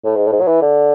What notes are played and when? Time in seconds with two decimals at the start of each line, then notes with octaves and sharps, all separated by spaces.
0.05 A2
0.16 G#2
0.27 A2
0.32 G#2
0.41 F#3
0.47 E3
0.62 D3